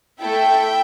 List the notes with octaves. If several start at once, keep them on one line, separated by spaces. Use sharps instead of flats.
A3 E4 A4 E5 G5